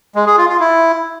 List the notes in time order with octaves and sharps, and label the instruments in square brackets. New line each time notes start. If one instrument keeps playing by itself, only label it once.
[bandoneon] G#3
G#4
F4
F4
E4